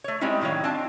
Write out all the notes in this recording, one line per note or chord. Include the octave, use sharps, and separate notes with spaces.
A3 C#5
G3 G#3 C4 C#4 D#4 E4
A2 D#3 F#3 C#5 F5
C4 D4 F4 A5